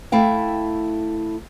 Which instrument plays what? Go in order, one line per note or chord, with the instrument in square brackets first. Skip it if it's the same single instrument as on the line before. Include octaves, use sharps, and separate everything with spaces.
[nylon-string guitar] A3 E4 F5 G5